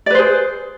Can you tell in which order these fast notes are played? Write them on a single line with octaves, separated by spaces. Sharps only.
D5 B4 C5 G#4